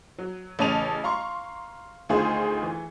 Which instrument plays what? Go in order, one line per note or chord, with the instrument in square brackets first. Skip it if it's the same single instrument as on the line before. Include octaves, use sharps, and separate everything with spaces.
[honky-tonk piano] F#3
A1 C#3 C#5 A5 D#7 F7
F5 A#5 C6 C#6
D2 D#3 F4 G#4 C5
E3